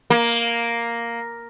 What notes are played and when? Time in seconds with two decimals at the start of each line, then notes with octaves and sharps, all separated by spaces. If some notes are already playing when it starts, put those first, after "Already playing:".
0.10 A#3